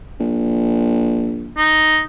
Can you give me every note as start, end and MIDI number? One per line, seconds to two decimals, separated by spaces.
0.20 1.56 34
1.57 2.00 63